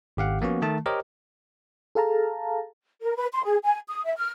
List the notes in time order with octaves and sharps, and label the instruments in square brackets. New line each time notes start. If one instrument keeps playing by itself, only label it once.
[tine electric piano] G#1 G4 F5 F#5
F3 A#3 B3 C#4 F#4
D#3 A3 A5
G4 A#4 C5 C#5 D#5
[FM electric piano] G#4 A4 F5 A5 A#5
[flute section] A#4
B4
C6
G#4
G#5
D#6
E5
F6